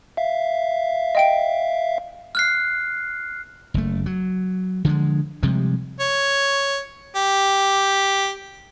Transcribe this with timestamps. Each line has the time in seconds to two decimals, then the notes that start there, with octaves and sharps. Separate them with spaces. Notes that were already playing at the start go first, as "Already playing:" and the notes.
0.17 E5 F5
1.15 D#5 G5 D7
2.35 F6 F#6 C7
3.74 F#1 A3
4.06 F#3
4.85 D3 F3 G3 G#3
5.43 C3 F3 G3 G#3
6.00 C#5
7.16 G4